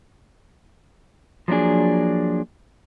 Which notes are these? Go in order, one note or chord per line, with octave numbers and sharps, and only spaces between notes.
F3 F#3 A#3 D4 G#4